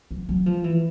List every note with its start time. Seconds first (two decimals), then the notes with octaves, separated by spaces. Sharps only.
0.11 F#3
0.29 F#3
0.46 F3
0.64 E3